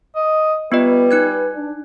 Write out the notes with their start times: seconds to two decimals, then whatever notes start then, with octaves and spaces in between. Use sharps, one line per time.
0.16 D#5
0.72 G3 B3 F4 B4 D#5
1.11 D#4 F#6 G#6
1.52 D4